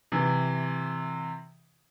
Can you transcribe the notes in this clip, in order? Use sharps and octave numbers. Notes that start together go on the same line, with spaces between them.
C3 E3